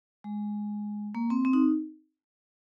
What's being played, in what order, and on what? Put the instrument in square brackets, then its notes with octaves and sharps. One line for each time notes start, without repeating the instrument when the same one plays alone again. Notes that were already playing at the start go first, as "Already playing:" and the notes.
[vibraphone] G#3
A#3
C4
C4
D#4